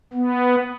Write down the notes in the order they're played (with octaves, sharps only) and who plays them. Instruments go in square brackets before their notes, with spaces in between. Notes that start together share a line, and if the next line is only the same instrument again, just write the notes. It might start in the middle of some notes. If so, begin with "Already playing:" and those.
[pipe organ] B3